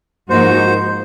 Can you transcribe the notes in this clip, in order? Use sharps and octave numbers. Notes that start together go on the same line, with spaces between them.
G#2 F3 A#3 D#4 F#4 C5